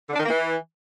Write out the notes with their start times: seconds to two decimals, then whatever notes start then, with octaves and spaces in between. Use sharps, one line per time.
0.09 D3
0.14 D4
0.19 D#3
0.24 A#3
0.29 E3